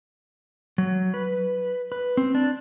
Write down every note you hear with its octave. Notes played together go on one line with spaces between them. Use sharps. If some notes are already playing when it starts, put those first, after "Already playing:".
F#3
B4
B4
C4
D4